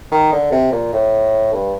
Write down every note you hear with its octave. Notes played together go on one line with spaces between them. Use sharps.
D#3
D3
C3
A#2
A2
G2